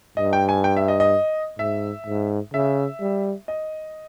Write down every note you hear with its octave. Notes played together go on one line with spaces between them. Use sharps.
G2 D#5
G5
G#5
G5
E5
D#5
D#5
G#2 E5
G#2
C#3 E5
G3
D#5